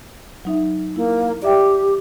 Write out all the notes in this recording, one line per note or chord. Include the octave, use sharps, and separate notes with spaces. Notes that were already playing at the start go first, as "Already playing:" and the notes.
F#3 D#4 E5
A#3 E4
G4 D5 E5 G5